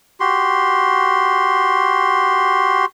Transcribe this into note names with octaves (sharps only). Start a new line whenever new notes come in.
F#4 G4 C6